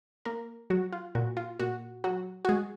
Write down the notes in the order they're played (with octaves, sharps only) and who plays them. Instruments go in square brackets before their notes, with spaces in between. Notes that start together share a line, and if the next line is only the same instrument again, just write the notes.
[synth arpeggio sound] A#3 A#4
F#3 F#4
F4
A#2 F#4
F4
A#2 F#4
F#3 F#4
F#4
G#3 G#4